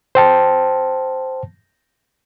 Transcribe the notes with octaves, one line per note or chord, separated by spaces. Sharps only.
C5 G5 A5